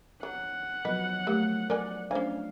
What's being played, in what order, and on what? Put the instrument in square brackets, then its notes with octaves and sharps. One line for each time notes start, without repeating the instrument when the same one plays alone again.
[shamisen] F#3 [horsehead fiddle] F#5
[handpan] F3 F#3 B3 [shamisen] B4 [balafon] D#5
[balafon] A3 G4 [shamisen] A#3
[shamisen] A#4 D#5 G#5 [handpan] D5
[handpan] A3 F5 [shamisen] C#4 G#5 [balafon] D4 C5